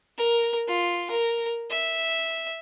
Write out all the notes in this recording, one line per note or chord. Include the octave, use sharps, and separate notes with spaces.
A#4
F4
A#4
E5